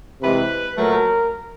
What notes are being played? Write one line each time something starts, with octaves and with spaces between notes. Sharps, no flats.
C3 E3 G#3 B4
A#2 F#3 A3 A#4